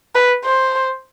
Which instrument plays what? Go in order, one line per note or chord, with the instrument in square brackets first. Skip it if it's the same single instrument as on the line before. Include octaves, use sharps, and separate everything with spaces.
[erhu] B4
C5